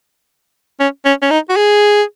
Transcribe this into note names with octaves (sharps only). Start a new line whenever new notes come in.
C#4
C#4
C#4
D#4
F#4
G#4